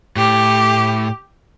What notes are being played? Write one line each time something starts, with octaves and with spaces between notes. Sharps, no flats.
A2 G4